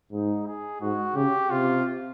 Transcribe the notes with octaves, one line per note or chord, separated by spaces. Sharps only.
G#2 D#4
G#4
G#2 F#4
C#3 G4
C3 F4